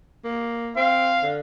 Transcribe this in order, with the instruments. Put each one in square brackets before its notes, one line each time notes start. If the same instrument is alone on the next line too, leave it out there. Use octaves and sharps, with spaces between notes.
[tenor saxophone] A#3
[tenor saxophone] C4 [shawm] F5
[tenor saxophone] D3